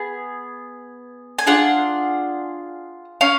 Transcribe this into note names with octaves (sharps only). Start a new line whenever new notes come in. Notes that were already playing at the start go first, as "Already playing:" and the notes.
Already playing: B3 G#4
G#5
D4 F4 G#4 F#5
C#4 F5